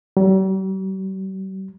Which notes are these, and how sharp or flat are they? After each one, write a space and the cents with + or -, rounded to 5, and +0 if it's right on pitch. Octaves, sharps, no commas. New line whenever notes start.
G3 -45